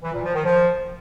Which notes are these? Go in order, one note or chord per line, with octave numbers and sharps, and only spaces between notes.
E3
A#2
F3
D#3
F3